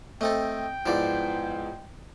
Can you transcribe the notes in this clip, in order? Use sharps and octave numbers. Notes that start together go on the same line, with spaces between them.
A3 C4 A4 D#5 G5
G#2 F3 B3 E4 D5